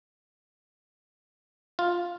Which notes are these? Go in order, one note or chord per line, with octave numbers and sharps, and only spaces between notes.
F4